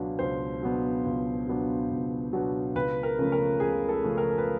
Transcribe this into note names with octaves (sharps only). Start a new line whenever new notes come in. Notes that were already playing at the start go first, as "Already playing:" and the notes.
Already playing: C#2 B2 F#3 B3 D4
C#2 C5
B2 F#3 B3 D4
C#2
B2 F#3 B3 D4
C#2
B2 F#3 B3 D4
C#2 B4
A#4
C#3 F3 A3 C#4
A#4
C#2 G#4
A4
C#3 F3 A3 C#4
A#4
B4